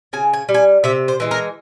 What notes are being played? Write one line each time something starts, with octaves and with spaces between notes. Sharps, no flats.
C#3 G#5
G#5
G3
G#5
C3 E5
C5
E3 G#3
A#4